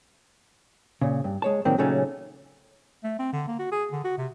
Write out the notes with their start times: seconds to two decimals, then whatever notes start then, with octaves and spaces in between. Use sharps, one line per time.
1.02 A#2 C#3
1.24 G2
1.42 G#3 C#5 A5
1.65 A#2 D#3 F#3 A#3 C4
1.78 A#2 C#3 F#3 A3 C#4 D#4
3.04 A3
3.19 C4
3.33 D3
3.48 A#3
3.59 F#4
3.72 G#4
3.92 D3
4.04 F#4
4.18 C3